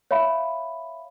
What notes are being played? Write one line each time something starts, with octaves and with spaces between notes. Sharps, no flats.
C#5 E5 F5 B5